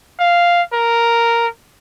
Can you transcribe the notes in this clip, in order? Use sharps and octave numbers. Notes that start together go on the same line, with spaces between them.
F5
A#4